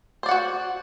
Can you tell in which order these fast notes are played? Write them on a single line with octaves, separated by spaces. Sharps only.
C5 D5 F#5 F#4